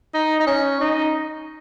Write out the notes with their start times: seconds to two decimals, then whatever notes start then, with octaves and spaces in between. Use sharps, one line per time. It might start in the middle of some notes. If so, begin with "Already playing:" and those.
0.14 D#4
0.40 D#4
0.47 C#4
0.80 D#4